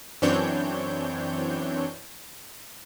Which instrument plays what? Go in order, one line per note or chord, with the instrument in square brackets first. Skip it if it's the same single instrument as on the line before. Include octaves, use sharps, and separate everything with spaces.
[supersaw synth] F#2 E3 C4 D4 C#5 G6